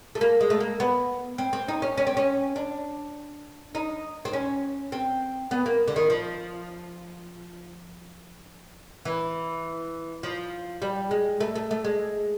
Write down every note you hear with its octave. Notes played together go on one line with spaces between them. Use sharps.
A3
A#3
G#3
A3
A#3
B3
C4
C4
D#4
C#4
C#4
C4
C#4
D4
D#4
C4
C#4
C4
B3
A#3
D3
D#3
F3
E3
F3
G3
G#3
A3
A3
A3
G#3